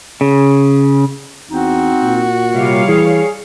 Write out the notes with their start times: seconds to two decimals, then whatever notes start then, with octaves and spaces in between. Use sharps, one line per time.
0.21 C#3
1.50 E2 C4 D#4 F#4
2.02 A#2
2.53 C3 G3 C#5 F5
2.87 E3 G#4